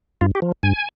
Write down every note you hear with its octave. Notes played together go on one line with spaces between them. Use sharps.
G2 F4
G4
F3
G2 G#5